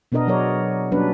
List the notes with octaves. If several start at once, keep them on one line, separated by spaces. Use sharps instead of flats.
B2 B3 D4 A#4 D#5
F#3 G#4 A#4 C#5 D5
F#3 G3 A#3 C#4 D4 B4